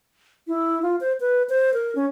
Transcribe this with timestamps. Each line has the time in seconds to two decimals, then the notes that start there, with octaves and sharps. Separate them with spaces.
0.48 E4
0.82 F4
1.01 C5
1.20 B4
1.49 C5
1.74 A#4
1.95 C#4